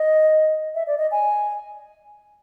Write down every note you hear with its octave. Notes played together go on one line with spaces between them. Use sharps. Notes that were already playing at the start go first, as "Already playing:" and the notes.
Already playing: D#5
E5
D5
D#5
G#5